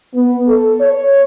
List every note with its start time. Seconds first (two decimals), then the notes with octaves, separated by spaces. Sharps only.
0.14 B3
0.46 A4
0.80 C#5